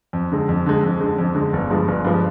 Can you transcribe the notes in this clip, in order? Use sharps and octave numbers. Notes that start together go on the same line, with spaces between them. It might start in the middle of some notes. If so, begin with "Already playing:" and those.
F2
D3 G#3
F2
D3 G#3
F2
D3 G#3
F2
D3 G#3
G1
G2 F3 G#3
G1
G2 F3 G#3